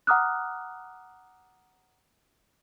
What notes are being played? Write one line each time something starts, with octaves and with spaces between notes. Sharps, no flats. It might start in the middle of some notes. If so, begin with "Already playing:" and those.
F#5 A#5 D6 D#6 F6 F#6